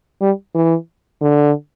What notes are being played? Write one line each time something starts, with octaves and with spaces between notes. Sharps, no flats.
G3
E3
D3